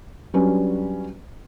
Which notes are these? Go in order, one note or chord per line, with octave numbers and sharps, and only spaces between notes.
F#3 G3 C#4 D4 B4